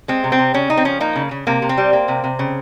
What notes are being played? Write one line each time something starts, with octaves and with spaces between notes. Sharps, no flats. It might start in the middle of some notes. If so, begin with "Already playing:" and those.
G#3 C4
C3
C4
C3
C#3 C#4
C#3 D#4
C4
F3 C#4
A#3 D#4
C#3
C#3
C3 A#3
C3
C4
G3
A#3
C3
C3
C#3